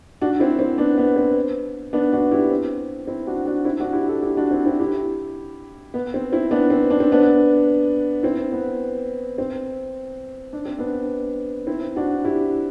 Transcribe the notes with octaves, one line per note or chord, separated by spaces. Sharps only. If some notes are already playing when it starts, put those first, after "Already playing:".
D4 F#4
C4 E4
C4
B3 D4
B3
C4
B3 D4
D4 F#4
E4 G4
C4
C4 E4
D4 F#4
D4 F#4
C4 E4
D4 F#4
E4 G4
F#4 A4
E4 G4
D4 F#4
C4 E4
C4 E4
E4 G4
B3
C4
C4 E4
B3 D4
C4
D4
C4
B3 D4
C4 E4
B3
C4
D4
C4
B3 D4
C4 E4
D4 F#4
E4 G4